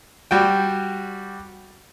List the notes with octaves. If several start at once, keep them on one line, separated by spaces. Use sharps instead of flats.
G3 F#4 G5